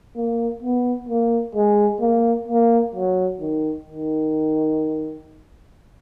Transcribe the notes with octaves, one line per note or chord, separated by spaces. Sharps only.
A#3
B3
A#3
G#3
A#3
A#3
F#3
D#3
D#3